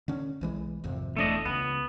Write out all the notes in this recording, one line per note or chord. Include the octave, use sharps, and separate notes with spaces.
D3 C#4
B1 E3 G#3
G#1 F2 C3
E1 E2 A3 D4 D#5
C#2 B3